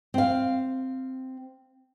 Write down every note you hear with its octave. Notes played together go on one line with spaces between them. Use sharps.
C4 F5